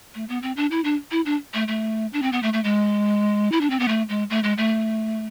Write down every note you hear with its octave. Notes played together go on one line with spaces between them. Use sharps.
A3
B3
C4
D4
E4
D4
E4
D4
A3
A3
D4
C4
B3
A3
A3
G#3
E4
D4
C4
B3
A3
G#3
A3
G#3
A3